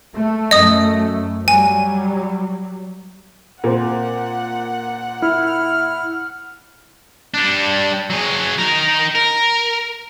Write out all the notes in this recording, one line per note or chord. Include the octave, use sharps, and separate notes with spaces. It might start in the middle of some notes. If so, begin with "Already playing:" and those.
A3
F#2 A3 D#5 D#6
F#3 G3 G#5
A#2 C4 F#5
E4 F6
G3 D4
F#3 G#4
D#4 A#4
A#4